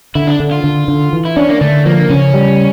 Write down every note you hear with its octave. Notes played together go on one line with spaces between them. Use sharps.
D3 E4
D4
D3
F4
D3
D3
E3
E4
C#4 D4
A#3
D3 A3
F3 A#3
C#3 C#4
G3